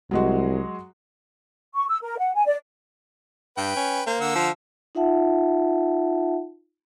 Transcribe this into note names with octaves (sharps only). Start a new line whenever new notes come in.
C2 F#3 G#3 F#4
C#6
E6
A#4
F#5
G#5
D5
G2 B4 G5
C#4
A#3 C5
D3 F#5 E6
F3
D#4 F4 E5 F#5 A5